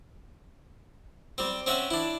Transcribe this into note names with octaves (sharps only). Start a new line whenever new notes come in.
G3 C4
C4 C#4 E5 F#5
D4 E4